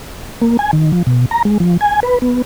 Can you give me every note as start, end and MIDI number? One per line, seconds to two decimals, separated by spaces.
0.41 0.57 58
0.59 0.71 80
0.73 0.92 51
0.92 1.03 53
1.07 1.26 47
1.31 1.42 82
1.45 1.58 56
1.60 1.77 53
1.81 2.00 80
2.03 2.19 71
2.22 2.42 59